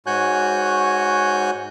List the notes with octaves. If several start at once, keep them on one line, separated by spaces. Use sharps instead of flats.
G#2 F#4 C#5 G#5 F#6 G6